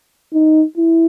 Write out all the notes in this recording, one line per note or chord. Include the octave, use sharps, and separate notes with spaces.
D#4
E4